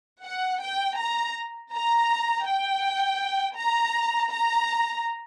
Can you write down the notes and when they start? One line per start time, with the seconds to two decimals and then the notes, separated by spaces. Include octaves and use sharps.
0.24 F#5
0.61 G5
0.98 A#5
1.73 A#5
2.46 G5
3.57 A#5
4.31 A#5